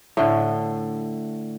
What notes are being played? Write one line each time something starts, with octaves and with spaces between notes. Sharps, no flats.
A2 D3